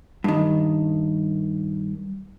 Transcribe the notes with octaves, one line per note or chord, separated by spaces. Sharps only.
G2 D#3